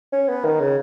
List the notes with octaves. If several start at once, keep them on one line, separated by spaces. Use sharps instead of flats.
C#4
B3
D#3
C#3